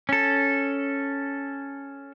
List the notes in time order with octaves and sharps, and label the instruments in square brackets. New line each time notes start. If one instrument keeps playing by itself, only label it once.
[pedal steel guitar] C#4 A4